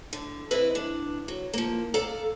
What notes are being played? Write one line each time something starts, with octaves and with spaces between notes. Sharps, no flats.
D3
C4 E4 B4 D#5
D4
F#3
F3 A#3
A4 D5 F5 A#5